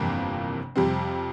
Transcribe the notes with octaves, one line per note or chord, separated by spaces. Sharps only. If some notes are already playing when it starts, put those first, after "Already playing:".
Already playing: G1 F2 C3 E3 A#3
F2 C3 G3 C4